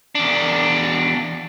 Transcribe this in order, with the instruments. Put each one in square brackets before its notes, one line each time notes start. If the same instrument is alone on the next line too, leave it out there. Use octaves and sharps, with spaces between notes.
[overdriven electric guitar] E2 D4